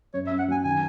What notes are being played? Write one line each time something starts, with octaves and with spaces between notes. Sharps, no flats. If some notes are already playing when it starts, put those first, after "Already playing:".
F#2 C#5
E5
F#2
F#5
F#3 G#5
D#3 G#5